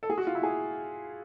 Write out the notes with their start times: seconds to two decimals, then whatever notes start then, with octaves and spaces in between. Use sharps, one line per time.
0.03 A4
0.10 G#4
0.18 F#4
0.27 F4
0.35 E4
0.43 G#4